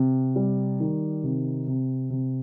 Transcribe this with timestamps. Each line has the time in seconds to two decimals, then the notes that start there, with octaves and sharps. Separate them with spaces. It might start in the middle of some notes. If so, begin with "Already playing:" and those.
Already playing: C3
0.36 G3
0.80 D#3
1.24 C3
1.67 C3
2.10 C3